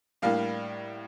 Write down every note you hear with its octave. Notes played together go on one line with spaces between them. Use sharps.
A2 G3 A#3 D4 F5